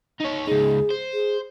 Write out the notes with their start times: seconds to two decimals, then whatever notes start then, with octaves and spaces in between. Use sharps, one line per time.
0.21 D#4 C#5
0.47 C#2 D#4 G#4
0.91 C5
1.13 G#4